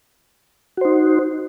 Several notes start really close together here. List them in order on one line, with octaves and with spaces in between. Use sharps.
F#4 C5 D#4